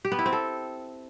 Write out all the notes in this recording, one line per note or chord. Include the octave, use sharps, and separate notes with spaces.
G4
B3
E4
C4
A4